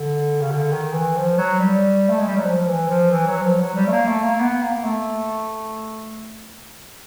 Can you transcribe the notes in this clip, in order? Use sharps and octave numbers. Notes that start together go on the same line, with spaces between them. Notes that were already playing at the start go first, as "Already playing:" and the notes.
Already playing: D3
C#3
D3
D#3
E3
F3
F#3
G3
A3
G#3
G3
F#3
F3
F3
E3
F3
E3
F#3
F3
F#3
G3
A3
A#3
A3
A#3
B3
A#3
A3